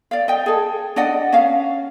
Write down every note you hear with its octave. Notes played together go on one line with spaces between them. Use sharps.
D5 F5
D#5 G5
G#4 A4
D4 D5 D#5 F#5
C#4 F5